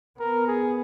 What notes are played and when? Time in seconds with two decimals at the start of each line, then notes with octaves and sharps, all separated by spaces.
0.19 B3 A#4
0.47 G#4